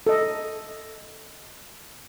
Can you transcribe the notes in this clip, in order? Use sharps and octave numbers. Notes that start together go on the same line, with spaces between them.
A4 D#5